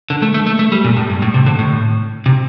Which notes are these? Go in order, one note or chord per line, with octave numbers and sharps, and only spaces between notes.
D3
A3
A3
A3
A3
G3
A#2
A2
G2
A2
C3
D3
A2
C3